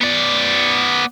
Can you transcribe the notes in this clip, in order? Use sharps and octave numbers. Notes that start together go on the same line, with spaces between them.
B3 D5